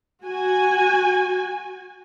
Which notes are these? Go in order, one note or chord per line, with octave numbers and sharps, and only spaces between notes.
F#4 G#5